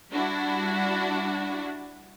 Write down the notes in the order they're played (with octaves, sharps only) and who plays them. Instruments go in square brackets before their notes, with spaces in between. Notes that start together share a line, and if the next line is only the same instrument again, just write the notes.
[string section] G3 D4 E4 F#4